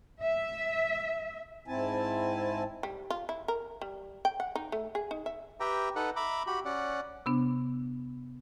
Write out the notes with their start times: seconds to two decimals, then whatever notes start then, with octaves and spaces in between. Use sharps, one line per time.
0.21 E5
1.68 G#2 C4 E4 G#5 A5
2.83 G3
3.10 F4
3.29 E4
3.48 A#4
3.81 G3
4.25 G5
4.40 F#5
4.55 D#4
4.72 A3
4.95 G#4
5.11 D#4
5.26 E5
5.60 G4 B4 E5 G5 A#5
5.96 D#4 A4 B4 F#5
6.16 E5 A#5 B5 D6
6.47 F#4 G4 B5
6.65 C#4 D5 F#5
7.26 C3 B3 D4